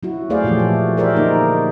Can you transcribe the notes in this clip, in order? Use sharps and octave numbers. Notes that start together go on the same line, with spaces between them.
F#3 E4 F#4
A3 G#4 C5 D5 F5
A#2 E3 F3 A3 G4
F#4
G4 G#4 A#4 C5 D5 E5
D3 A#3 D#4